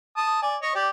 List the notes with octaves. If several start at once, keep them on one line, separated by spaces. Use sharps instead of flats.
A5 D#6
D5 G#5
C#5 D#5
G4 D5